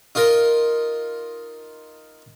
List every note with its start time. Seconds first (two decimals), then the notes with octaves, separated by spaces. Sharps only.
0.15 D#4 F4 A#4